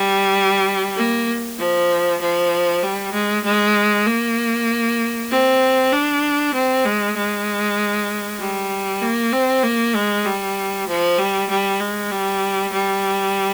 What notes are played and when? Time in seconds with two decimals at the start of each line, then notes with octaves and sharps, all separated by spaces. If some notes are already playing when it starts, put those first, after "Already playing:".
Already playing: G3
0.96 A#3
1.59 F3
2.21 F3
2.83 G3
3.13 G#3
3.45 G#3
4.07 A#3
5.30 C4
5.92 D4
6.54 C4
6.85 G#3
7.16 G#3
8.39 G3
9.02 A#3
9.33 C4
9.63 A#3
9.95 G#3
10.25 G3
10.88 F3
11.18 G3
11.50 G3
11.80 G#3
12.11 G3
12.73 G3